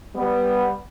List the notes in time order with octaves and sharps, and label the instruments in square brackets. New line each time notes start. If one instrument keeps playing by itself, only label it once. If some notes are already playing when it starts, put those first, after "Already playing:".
[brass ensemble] G3 B3